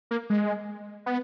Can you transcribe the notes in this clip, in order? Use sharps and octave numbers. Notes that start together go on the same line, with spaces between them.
A#3
G#3
B3